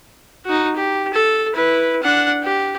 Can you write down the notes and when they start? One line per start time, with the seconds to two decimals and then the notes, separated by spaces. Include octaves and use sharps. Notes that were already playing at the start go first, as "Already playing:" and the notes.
0.46 D#4 F#4
0.76 G4
1.14 A4
1.54 E4 B4
2.02 D4 F#5
2.43 G4